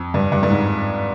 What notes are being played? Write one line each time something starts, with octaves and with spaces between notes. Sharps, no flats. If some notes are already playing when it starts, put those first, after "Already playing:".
Already playing: F2
G2
G2
G2
G#2